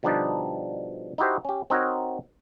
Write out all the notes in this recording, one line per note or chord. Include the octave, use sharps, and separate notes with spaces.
B2 D3 F3 G3 D4 D#4
D#4 E4 F#4 G4 C5
C#4 G4
C4 D#4 F#4 A#4 C#5